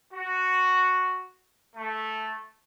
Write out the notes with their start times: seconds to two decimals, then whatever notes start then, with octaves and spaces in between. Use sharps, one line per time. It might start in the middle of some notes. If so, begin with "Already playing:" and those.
0.13 F#4
1.76 A3